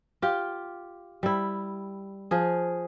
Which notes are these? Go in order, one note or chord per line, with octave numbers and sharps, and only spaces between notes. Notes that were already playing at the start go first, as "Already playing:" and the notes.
F4 G4
G3 E4
F3 G#4